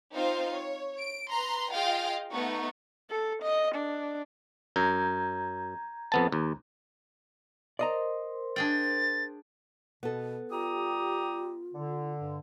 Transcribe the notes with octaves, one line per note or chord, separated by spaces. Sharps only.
C4 D#4 F4 C5 F5
C#5
D7
B4 A#5 C6
F4 G#4 D#5 F5 G5
A3 B3 D#4 C#6
A4
D#5
D4
F#2 A#5 G6 G#6
F2 B3 A5
D#2
A#4 C5 D5 D#5 A#5 C6
D4 G#4 G5 A6
B2 B3 A4
G3 F4 G4 A#5 D#6
D3
G2